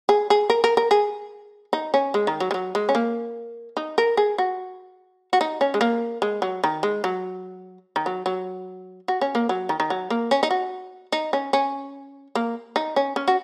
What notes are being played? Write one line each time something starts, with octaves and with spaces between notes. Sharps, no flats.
G#4
G#4
A#4
A#4
A#4
G#4
D#4
C#4
G#3
D#3
F#3
G#3
F#3
G#3
C#4
A#3
D#4
A#4
G#4
F#4
F#4
D#4
C#4
G#3
A#3
G#3
F#3
D#3
G#3
F#3
D#3
F#3
F#3
F#4
C#4
A#3
F#3
D#3
D#3
F#3
A#3
C#4
D#4
F#4
D#4
C#4
C#4
A#3
D#4
C#4
C#4
F#4